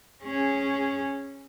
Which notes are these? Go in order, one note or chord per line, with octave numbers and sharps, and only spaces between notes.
C#4 G#4